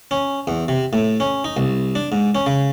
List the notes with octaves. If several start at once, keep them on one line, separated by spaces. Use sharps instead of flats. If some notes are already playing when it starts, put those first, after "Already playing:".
C#4
E2
C3
A2
C#4
D#4
C2
D4
G#2
C#4
C#3